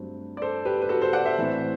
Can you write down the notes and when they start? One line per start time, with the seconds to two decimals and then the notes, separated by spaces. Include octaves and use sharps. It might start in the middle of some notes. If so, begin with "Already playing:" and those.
Already playing: G2 F#3 A3 C4
0.37 D5
0.42 A4 C5
0.65 G4 B4
0.82 B4
0.89 F#4 A4
1.01 A4 C5
1.13 D5 F#5
1.25 C5 E5
1.38 A2 E3 A3 C4